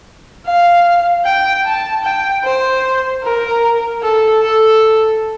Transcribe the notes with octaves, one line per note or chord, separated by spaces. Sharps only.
F5
G5
A5
G5
C5
A#4
A4
A4